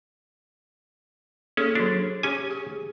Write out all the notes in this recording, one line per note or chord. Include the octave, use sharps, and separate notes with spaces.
A#3 C#4 G#4 A4
F#3 D4 F#4
C#4 G4 G#4 G#5
G#4